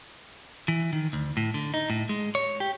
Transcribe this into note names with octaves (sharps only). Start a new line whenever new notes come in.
E3
D#3
D2
A2
D3
D#4
A2
G#3
C#5
G4